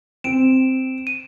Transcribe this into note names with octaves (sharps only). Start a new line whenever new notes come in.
C4 D7 E7
D#7